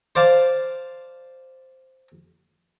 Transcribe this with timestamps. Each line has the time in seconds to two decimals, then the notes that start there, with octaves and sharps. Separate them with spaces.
0.15 C5 D5 F5 A5